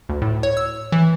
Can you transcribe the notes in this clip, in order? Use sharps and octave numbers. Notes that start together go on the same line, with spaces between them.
D2
A2
C#5
E6
E3